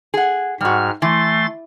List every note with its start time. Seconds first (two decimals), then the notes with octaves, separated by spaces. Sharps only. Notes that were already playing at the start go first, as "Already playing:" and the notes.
0.14 G#4 F#5
0.61 G#2 G3 F#4 F6
1.02 E3 A3 C6 A6